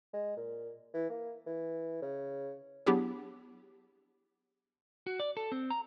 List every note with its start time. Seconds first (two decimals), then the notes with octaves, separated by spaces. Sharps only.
0.13 G#3
0.37 A#2
0.94 E3
1.10 A#3
1.47 E3
2.02 C#3
2.86 F#3 B3 D4 E4 G4 G#4
5.07 F#4
5.20 D5
5.37 A4
5.52 C4
5.70 A#5